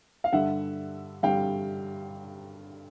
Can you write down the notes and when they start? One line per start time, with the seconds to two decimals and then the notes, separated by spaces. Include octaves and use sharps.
0.24 F5
0.32 G2 D3 G3 E5 F#5
1.23 G2 D3 G3 F5 G5